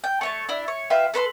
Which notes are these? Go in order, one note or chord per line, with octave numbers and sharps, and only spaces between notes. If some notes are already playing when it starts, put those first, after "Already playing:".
G5
A3 C#5 A5
D4 E4
C#5
F4 G4 B4 E5
A4 B4 B5 C6